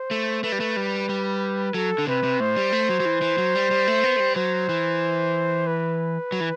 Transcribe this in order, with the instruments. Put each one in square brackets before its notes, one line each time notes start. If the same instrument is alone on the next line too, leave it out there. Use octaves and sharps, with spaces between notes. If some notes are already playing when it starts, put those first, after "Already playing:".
Already playing: [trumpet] C5
[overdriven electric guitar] A3
[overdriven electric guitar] A3 [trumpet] B4
[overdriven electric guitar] G3
A3
G3
G3
[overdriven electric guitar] F#3 [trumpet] A4
[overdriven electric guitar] D3
[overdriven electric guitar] C3 [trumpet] B4
[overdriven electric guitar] C3
[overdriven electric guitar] A2 [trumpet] C5
[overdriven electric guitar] G3
A3
F#3
F#3
E3
E3
F#3
G3
G3
A3
B3
A3
G3
[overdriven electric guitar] F#3 [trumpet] C5
[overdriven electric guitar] E3
[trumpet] B4
[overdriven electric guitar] F#3
E3